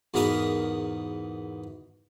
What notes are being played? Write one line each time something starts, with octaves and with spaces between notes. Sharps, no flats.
E2 G#2 B2 A#4 B4 D#6